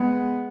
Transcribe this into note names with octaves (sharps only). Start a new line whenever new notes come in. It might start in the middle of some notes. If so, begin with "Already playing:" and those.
Already playing: G#3 B3